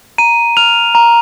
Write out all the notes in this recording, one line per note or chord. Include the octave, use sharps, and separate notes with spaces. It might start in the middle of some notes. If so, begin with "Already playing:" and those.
A#5 D#7
F6 F7
A#5